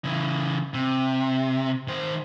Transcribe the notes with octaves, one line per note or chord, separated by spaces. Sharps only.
C#3 E3
C3
D#3 C5